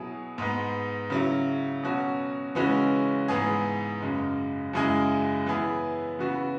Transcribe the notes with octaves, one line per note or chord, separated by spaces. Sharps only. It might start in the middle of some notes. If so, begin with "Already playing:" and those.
Already playing: B2 F#3 E4 G#4
G#2 G#3 B3
C#3 F#3 E4
B2 F#3 C#4 F#4
C#3 E3 G#3 C#4 F#4
G#2 E3 B3 G#4
F#2 C#3 G#3
F#2 C#3 G#3 E4 G#4
E3 B3 E4 G#4
C#3 E3 B3 F#4